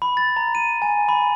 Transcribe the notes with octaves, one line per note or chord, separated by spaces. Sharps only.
B5
A6
A#5
D#7
G#5
B5